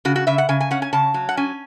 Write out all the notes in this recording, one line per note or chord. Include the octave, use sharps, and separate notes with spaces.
C#3 F#4
F#4
C#3 E5
F#5
C#3 G#5
G#5
C#4 F#5
G#5
C#3 A5
F#3
F#5
C#4 G#5